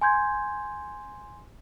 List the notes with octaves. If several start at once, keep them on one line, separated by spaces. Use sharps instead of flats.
G#5 C6 G6 G#6